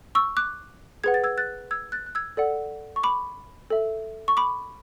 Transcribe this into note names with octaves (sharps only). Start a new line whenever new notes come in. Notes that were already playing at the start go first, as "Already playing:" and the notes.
C#6 E6
D6 F#6
G#4 B4 F#5 G#6
A6
E6 G#6
F#6 A6
E6 G#6
F#6 A6
F#6
E6 G#6
A4 D5 F#5
C#6
B5 D6
A4 E5
C#6
B5 D6